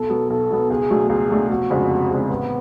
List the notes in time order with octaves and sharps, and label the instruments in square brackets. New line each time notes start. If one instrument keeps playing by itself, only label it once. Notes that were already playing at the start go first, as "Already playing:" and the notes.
Already playing: [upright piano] B1 [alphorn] A4
[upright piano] B2 F#3 B3
[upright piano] B1 [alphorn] A4
[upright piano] B2 F#3 B3
[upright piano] C#2 [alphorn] G#4
[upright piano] B2 F#3 A3 D4
[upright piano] C#2 [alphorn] G#4
[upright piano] B2 F#3 A3 D4
[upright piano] F1 [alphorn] F#4
[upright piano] F2 C#3 G#3 D4
F1
F2 C#3 G#3 D4
[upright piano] A1 [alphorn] B3